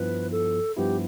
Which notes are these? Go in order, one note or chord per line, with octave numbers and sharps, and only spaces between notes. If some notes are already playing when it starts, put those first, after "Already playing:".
Already playing: G2 F3 B3 E4 B4
A4
G2 F3 B3 E4 G4